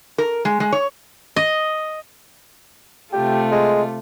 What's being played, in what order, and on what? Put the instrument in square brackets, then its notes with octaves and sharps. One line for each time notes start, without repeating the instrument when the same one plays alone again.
[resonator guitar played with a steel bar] A#4
G#3
G#3
C#5
[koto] D#5
[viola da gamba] C3 A3 F4 [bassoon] G4
[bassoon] G#3